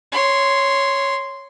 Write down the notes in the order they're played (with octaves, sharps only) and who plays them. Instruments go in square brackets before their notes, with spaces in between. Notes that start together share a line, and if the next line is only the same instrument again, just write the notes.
[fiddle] C#5 C6